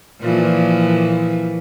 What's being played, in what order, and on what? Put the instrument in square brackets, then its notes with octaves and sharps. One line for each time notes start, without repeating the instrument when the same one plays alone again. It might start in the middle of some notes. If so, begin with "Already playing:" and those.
[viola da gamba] A#2 E3 F3